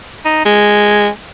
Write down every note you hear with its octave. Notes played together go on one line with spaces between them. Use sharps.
D#4
G#3